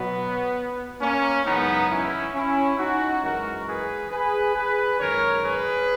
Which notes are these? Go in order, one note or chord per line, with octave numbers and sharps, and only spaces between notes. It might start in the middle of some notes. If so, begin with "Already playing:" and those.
Already playing: B2 F#3 B3
A#3 C#4
F#2 C#3 E3 G#3 B3 D#4
C#4 E4
C#4 E4
D#4 F#4
F#2 E3 G#3 F#4 A#4
G#4 B4
G#4 B4
G#4 B4
F#2 D#3 G#3 A#4 C#5
G#4 B4